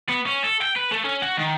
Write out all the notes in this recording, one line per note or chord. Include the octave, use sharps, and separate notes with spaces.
B3
C#4
A4
G5
B4
A3
C#4
F#4
D#3